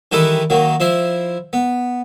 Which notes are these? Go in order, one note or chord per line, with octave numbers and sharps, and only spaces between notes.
D#3 E3 G3 E4 A4 B4
D#3 F#3 A#3
F3 E4 C6
B3